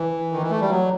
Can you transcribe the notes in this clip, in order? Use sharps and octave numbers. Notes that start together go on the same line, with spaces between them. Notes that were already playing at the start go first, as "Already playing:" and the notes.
Already playing: E3
D#3
E3
A3
G3
F#3